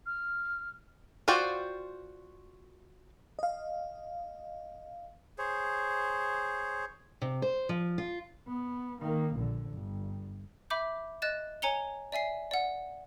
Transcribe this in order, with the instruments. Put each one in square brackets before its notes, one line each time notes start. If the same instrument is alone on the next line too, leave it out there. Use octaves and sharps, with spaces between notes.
[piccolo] F6
[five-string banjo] F4 F#4 C5 D5 G5
[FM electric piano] D#5 F5
[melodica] G#4 C5 C#5
[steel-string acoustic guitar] C3
C5
F3
F4
[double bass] B3
D#3 A#3
A#1 D3
G1
[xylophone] E5 B5 D6 G6
D#5 F#6 A6 E7
C#5 G#5 A#5 C#7 F7 G7
D5 E5 G#5 C7
D5 F#5